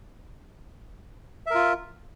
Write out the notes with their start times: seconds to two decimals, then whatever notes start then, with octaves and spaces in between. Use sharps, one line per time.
1.46 E5
1.51 A#4
1.55 F4